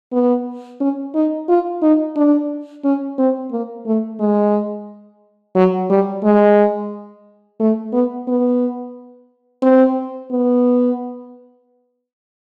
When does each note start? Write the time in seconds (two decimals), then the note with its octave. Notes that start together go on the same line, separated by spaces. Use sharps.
0.12 B3
0.81 C#4
1.14 D#4
1.49 F4
1.82 D#4
2.16 D4
2.84 C#4
3.18 C4
3.52 A#3
3.86 A3
4.20 G#3
5.55 F#3
5.90 G3
6.23 G#3
7.60 A3
7.93 B3
8.28 B3
9.63 C4
10.31 B3